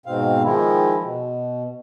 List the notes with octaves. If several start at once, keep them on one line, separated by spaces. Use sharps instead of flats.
G#2 B2 C4 F5
D#3 F3 G#3 E4
B2